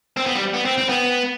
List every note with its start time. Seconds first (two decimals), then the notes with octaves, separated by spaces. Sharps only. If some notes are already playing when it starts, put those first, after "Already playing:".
0.17 C4
0.26 B3
0.35 G3
0.54 B3
0.65 C4
0.78 C4
0.89 B3